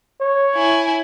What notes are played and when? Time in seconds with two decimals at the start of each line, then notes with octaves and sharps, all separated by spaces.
0.21 C#5
0.55 E4 G#5